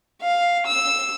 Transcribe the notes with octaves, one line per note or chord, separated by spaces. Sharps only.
F5
E6